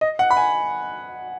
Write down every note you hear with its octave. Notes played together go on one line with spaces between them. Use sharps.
D#5
F#5
B5
G#5